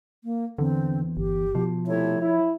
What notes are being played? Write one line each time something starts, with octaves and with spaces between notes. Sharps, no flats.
A#3
E2 D3 C4
G1 G4
B2 F3
C3 A3 E4 C#5
E4